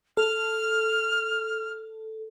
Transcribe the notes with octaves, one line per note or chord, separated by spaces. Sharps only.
A4 F6